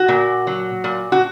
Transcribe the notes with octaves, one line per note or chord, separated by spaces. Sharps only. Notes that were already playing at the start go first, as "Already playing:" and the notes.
Already playing: F#4
A#2
F#3
A#2
F#4